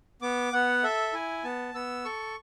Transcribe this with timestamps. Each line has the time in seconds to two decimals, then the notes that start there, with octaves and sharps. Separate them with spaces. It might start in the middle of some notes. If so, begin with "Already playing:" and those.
0.22 B3 D6
0.53 B3 F#5
0.83 A4 E5
1.13 E4 G#5
1.44 B3 A5
1.74 B3 E6
2.05 A4 C#6